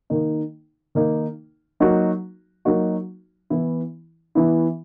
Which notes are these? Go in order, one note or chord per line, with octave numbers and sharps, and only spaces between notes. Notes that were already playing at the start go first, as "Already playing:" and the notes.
D#3 A#3 D#4
D#3 A#3 D#4
F#3 A#3 D#4 F#4
F#3 A#3 D#4 F#4
E3 B3 E4
E3 B3 E4